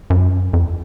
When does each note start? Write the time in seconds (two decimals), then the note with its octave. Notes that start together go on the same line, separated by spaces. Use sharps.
0.10 F#2
0.53 F2